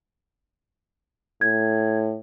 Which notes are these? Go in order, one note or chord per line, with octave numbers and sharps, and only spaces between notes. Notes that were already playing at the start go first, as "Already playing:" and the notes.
A2 G#6